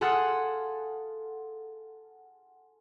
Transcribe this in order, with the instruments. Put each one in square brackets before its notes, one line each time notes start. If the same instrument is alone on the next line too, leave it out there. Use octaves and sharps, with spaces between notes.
[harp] G#4 A4 F5 F#5 C6